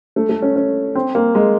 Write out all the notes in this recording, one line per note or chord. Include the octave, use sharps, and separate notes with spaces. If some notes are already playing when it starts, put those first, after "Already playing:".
A3
A3
C#4
C#4
C4
A#3
G#3